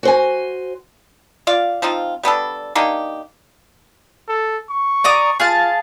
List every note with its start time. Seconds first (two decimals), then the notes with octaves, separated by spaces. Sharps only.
0.03 F#4 C5 G#5
1.47 F4 D5 F5
1.82 F3 C4 D#4 F4
2.23 G3 B3 D4 A4
2.75 A#3 D4 D#4 G4
4.28 A4
4.70 C#6
5.04 D5 A#5 D#6
5.40 F4 G#4 F5 A5